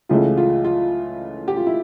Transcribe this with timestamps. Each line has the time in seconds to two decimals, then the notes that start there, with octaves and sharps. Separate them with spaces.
0.09 C#2 C#3 E3 A3 F4
0.37 F4
0.65 F4
1.48 G4
1.57 F4
1.66 E4